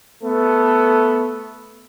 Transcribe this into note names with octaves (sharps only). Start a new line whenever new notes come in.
A3 B3 A4